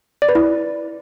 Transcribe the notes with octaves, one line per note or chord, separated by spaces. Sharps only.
D5
B4
E4